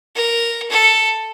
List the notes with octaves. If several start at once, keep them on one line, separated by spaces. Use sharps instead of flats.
A#4
A4